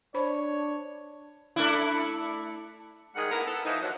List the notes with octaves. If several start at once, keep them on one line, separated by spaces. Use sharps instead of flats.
D4 C5 C#5 B5
A3 D4 E4
G#2 D#3 G3 G#3 G#4 F#5
D3 G#3 A#3 B3 E4 A#4
B3 A4
E3 F3 D#4
D3 D#3 F3 F#3